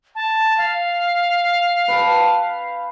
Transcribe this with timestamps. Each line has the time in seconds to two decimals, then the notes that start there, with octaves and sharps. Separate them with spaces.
0.15 A5
0.58 F5
1.88 B4 G5 A5